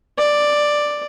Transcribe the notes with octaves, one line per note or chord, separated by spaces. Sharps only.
D5